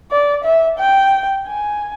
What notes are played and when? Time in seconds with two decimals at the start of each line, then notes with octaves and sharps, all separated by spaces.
0.11 D5
0.44 E5
0.79 G5
1.47 G#5